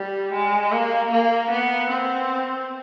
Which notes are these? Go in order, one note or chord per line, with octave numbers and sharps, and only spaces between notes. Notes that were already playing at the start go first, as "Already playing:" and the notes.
Already playing: G3
G#3
A#3
A#3
B3
C4